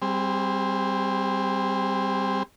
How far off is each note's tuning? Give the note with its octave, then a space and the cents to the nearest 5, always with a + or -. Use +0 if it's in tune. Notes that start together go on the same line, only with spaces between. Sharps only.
G3 +0 C4 +0 G#4 -30